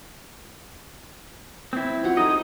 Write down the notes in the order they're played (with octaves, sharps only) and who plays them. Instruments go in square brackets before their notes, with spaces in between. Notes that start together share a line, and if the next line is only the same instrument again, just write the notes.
[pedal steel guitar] C4 E4 [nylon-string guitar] C5
[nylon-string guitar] F4 F#4 F#5
[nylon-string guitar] D#4 G#4 A4 [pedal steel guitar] D#5